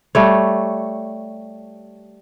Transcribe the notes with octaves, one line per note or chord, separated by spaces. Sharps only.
G3 A3 C#5